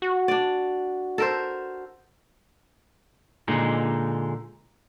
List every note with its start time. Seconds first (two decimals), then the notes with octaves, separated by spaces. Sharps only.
0.02 F#4
0.28 D4 D5
1.18 A4 A#4 C5
3.48 A#2 D3 G#3 D#4